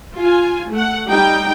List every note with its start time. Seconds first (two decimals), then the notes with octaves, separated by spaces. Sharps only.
0.17 F4 G#5
0.71 A3 F#5
1.09 G3 D#4 G5